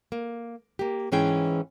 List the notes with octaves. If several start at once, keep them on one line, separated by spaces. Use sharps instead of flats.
A#3
A#3 G4
G#2 E3 C#4 G#4 G5 G#5